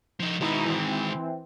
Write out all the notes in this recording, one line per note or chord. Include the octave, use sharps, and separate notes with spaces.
F3 D#4
B2 D#3 G#3 D#4 E4
E3 C4